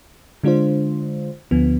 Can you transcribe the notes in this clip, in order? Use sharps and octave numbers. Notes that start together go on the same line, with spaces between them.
D3 G#3 D4 F4 C5
D2 D3 F3 B3